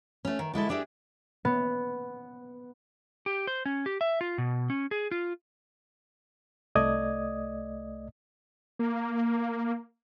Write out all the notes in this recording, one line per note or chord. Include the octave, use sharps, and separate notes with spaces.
A3 C#4
D#3
D3 G#3 E4 A4
A3 D4 G4 G#4 E5
B3
G4
C5
C#4
G4
E5
F4
B2
C#4
G#4
F4
C2 A3 D5 D#5 D#6 G#6
A#3